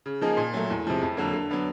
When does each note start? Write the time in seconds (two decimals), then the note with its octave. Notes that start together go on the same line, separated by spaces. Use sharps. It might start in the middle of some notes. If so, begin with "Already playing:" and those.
0.06 C#3
0.22 F3 A#3 D#4 G#4
0.37 A#2
0.54 F#3 A3
0.70 E2
0.85 C3 F3 G#3
1.02 F2
1.17 D3 F#3 A#3
1.33 D3
1.50 F#3 B3 D4